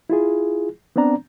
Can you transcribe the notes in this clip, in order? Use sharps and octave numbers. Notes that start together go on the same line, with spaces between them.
E4 F4 G#4
B3 C4 D4 D5 A#5